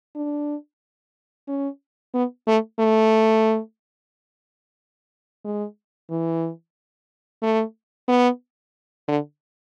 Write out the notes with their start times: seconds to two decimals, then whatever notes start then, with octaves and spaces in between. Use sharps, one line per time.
0.15 D4
1.48 C#4
2.14 B3
2.47 A3
2.79 A3
5.44 G#3
6.10 E3
7.42 A3
8.08 B3
9.08 D3